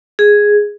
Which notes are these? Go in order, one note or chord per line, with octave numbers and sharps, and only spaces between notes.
G#4